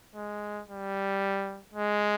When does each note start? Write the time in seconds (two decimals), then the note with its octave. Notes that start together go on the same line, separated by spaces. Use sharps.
0.15 G#3
0.68 G3
1.73 G#3